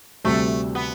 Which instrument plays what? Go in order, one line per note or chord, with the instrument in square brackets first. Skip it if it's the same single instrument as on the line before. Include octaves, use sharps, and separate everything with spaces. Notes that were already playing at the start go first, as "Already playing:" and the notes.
[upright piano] D2 C3 G3 [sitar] A3
[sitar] B3